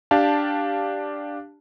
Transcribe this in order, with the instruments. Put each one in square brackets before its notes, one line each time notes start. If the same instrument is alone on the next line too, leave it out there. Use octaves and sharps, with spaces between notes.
[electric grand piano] D4 G4 F5 A5